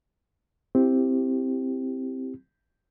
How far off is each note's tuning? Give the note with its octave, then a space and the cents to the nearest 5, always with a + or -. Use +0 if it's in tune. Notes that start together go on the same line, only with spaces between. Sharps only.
C4 +0 E4 +5 G4 +0